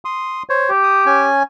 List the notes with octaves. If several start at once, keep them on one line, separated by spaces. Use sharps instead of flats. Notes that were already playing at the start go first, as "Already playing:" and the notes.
C6 D#6
C5 C#5
G4
D#6
C#4 G#5